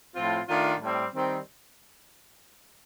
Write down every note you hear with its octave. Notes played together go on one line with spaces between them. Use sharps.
A2 F3 C4 F4
D#3 A3 D4 F4
A2 G3 C4
D#3 G3 C4